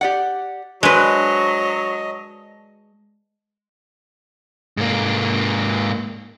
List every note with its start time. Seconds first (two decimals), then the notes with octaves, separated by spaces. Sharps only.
0.01 G4 D5 F#5
0.83 F#3 G#3 D4 B4 C5 D#5
4.77 G#2 A#3